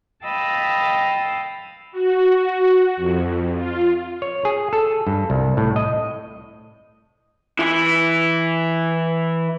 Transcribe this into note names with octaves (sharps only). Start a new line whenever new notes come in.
D#5 F5 G5 A5 B5 E6
F#4
F2
F4
C#5
G#4
A4
G2
C2
A2
D#5
E3 E4